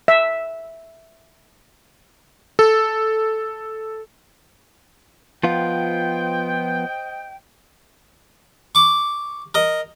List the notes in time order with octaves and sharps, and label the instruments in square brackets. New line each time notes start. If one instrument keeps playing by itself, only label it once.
[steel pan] E5
[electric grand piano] A4
[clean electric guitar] F3 B3 F4 [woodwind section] C5 D#5 G5
[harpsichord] C#6 D6
A#4 D#5